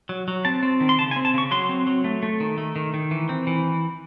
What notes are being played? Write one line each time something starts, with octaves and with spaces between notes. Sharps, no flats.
F#3
F#3
C4 A5
C4
D#3
C6
C#3 A5
G#5
C4
A5
C#3 C#6
F#3 C6
C4
F#3
A3
A3
D#3
A3
D#3
D#3
E3
C4
E3